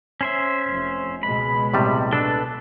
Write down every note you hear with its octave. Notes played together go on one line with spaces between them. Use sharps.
C#4 C5 E5
F1 F2
C#2 B2 G#3 B5
A2 C3 G3
D4 A4 B4 E6